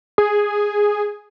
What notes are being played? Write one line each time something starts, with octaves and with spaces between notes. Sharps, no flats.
G#4